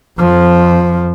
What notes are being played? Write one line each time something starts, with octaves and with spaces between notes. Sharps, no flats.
F2 F3